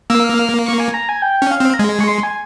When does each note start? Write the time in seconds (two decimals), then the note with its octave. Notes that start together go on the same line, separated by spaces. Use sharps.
0.10 A#3 E6
0.24 F6
0.38 F6
0.66 C#6
0.80 G#5
0.94 A#5
1.09 G#5
1.22 G5
1.42 C#4
1.51 F5
1.60 C4
1.74 A#5
1.79 G#3 G#5
2.00 C#6
2.07 C6
2.23 G#5